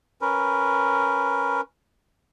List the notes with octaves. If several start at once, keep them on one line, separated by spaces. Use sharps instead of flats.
C#4 A#4 B4